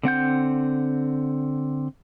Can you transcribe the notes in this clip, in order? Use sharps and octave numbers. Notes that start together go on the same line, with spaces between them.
D3 C4 F#5 G6